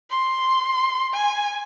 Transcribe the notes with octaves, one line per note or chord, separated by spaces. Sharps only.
C6
G#5